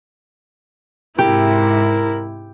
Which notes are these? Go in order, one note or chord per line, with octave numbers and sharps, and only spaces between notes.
G#2 C3 E4 G4 A#4